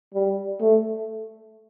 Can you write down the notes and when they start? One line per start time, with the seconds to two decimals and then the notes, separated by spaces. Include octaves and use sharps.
0.15 G3
0.61 A3